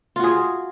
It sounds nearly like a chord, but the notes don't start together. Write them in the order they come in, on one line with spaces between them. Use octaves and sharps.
F4 F#4 G#4